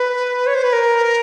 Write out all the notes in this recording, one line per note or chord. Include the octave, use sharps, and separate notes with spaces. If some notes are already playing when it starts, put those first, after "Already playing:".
Already playing: B4
C#5
C5
B4
A#4